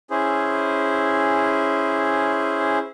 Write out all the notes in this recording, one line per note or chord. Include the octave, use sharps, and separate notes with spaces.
C#4 E4 G#4 C5